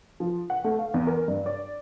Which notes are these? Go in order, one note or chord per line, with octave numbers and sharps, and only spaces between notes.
F3
F#5
A3
F5
E2
A#4
G2
D5